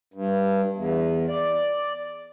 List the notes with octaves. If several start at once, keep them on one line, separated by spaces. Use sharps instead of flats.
G2
E2
D5